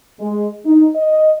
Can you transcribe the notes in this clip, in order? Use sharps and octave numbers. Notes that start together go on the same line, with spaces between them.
G#3
D#4
D#5